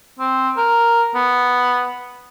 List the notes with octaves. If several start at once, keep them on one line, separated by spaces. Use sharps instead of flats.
C4
A#4
B3